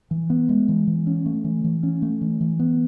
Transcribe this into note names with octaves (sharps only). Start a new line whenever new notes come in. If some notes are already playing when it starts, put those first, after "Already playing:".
E3
B3
G#3
E3
E3
C#4
A3
E3
E3
C#4
A3
E3
E3
B3